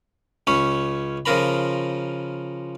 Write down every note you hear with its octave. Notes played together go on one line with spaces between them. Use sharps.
C#2 C#4 C#5 B5
C#3 F3 F4 A#4 A#5 B5